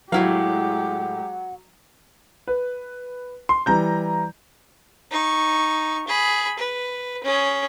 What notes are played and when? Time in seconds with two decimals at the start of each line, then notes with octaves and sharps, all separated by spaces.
0.12 A2 F#3 G#3 E4 G4 F5 F#5
2.48 B4
3.49 C6
3.66 E3 G3 A#5 G6
5.11 D#4 C#6
6.08 G#4 B5
6.59 B4
7.24 C#4 G#4